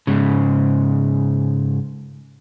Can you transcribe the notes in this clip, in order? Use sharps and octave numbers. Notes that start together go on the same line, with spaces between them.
G#2 C#3